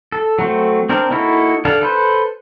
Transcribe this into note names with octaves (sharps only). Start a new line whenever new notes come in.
A4
F#3 A3 C4
C4 D4 A#4
A#3 D#4 E4 F#4 A4
D3 D4 A4 F5
A4 B4 C5